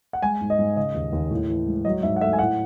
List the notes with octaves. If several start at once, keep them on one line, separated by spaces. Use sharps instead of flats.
F#5
G#3 G#5
G#2
D#5
G#2
C#3 D#5
D#2
D#2
A2
E3
G#3
F#3 D#5
G#2 E5
F#5
A3 E5
G#5
A2 F#5